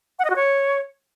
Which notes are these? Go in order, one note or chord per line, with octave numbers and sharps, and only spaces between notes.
F#5
D#5
F#4
C#5